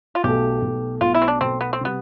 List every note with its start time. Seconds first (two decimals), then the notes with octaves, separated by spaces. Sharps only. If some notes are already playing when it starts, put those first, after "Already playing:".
0.15 F4
0.24 B1 B2 A3 G4
0.62 B1 B2 A3
1.01 B1 B2 A3 F4
1.15 E4
1.22 C4
1.28 D4
1.41 B1 B2 A3 C4
1.61 B3
1.73 C4
1.81 C3 G3 B3